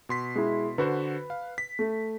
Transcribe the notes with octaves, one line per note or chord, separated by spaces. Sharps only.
B2 C6 B6
G#3 E4
D3 F#4 B4 C5
F5
B6
A3